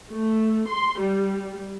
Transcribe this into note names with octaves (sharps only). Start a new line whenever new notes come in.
A3
C6
G3